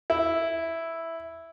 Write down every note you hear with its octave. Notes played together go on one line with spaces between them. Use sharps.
E4